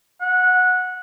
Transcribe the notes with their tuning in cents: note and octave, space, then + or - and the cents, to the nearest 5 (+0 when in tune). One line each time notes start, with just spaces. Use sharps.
F#5 -15